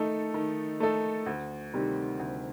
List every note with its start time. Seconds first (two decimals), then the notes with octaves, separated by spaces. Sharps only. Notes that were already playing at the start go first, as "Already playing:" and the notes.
Already playing: D#3 A3 D#4 A4
0.34 D#3
0.80 A3 D#4 A4
1.26 D2
1.74 C3 D#3 G3 C4
2.20 D2